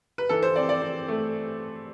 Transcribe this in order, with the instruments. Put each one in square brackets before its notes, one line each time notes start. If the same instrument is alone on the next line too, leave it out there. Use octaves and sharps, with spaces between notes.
[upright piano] B4
E3 A4
C5
C4 D5
D5
C4
A3